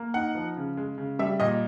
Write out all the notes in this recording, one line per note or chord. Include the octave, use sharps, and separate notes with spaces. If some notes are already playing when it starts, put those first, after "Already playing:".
Already playing: A#3
D#4 F#5
F3
C#3
G#3
C#3
G3 E5
A#2 D#5